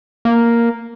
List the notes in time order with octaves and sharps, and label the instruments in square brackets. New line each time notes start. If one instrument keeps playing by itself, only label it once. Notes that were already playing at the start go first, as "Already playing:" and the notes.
[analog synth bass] A#3